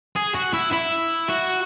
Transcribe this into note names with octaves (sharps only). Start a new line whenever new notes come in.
G#4
F#4
E4
E4
F#4